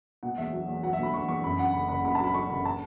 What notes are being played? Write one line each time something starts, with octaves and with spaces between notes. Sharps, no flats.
B2 F#5
E2 E5
F#3
E2
F#3 F#5
E5
B2 B5
E2 C#6
E2 C#6
F#2 B5
F#2 F#5
F#1 B5
F#1 B5
F#2 B5
A5
F#3 B5
F#3 C#6
F#1 B5
A5